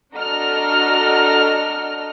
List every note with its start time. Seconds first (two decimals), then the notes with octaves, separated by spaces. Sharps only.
0.16 D4 F#4 A4 D#5 A#5 F6